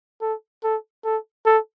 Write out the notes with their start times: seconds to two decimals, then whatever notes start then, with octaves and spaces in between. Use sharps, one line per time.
0.21 A4
0.64 A4
1.04 A4
1.46 A4